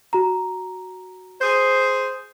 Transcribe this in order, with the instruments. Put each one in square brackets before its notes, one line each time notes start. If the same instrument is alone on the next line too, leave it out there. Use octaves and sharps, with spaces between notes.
[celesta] F#4 A#5
[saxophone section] G#4 C5